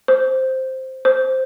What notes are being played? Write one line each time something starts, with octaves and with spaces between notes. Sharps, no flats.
C5
C5